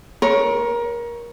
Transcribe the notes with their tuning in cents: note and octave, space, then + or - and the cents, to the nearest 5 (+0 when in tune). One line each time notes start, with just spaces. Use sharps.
A#4 +25 C#5 +0